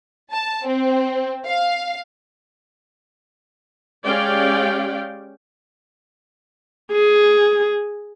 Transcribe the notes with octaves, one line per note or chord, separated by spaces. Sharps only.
A5
C4
F5
G#3 C#4 G4 D5 F5 G5
G#4